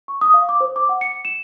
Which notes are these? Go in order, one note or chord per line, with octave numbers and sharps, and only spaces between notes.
C#6
D#6
F5
D6
C5
D6
F#5
C#7
E7